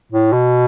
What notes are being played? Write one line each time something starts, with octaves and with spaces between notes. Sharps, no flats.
A2
B2